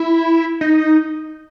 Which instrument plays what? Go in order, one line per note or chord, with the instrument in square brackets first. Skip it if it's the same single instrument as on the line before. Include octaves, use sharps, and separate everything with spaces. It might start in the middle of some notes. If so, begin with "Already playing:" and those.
Already playing: [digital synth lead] E4
D#4